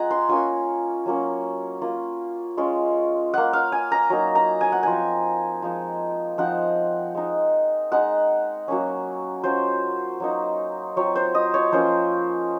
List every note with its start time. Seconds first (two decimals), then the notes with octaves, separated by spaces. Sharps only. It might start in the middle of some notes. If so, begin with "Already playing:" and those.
Already playing: G#3 F4 F#5 G#5 A#5
0.10 C6
0.29 A#3 C#4 F4 G#5
1.06 F#3 A#3 C#4
1.81 A#3 F4
2.57 G#3 C#4 F4
3.34 A#3 F4 F#5
3.53 F5
3.72 G#5
3.92 A#5
4.10 F#3 A#3 D#4
4.35 A#5
4.61 G#5
4.72 F#5
4.83 F3 C4 F4 G#5
5.62 F3 G#3 D#4
6.38 F3 C4 D#4 F#5
7.15 G#3 D#4
7.92 G#3 D#4 F#5
8.68 F#3 A#3 C#4
9.43 F#3 C#4 F4 C5
10.20 F#3 A#3 D#4
10.96 F#3 C4 F4 C#5
11.16 C5
11.35 D#5
11.54 C#5
11.72 F3 A#3 C#4 F4 C5